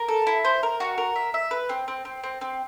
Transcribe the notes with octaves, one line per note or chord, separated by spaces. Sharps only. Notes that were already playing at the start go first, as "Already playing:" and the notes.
Already playing: A#4
A4
E4
C5
A#4
F#4
A#4
E5
E5
B4
C4
C4
C4
C4
C4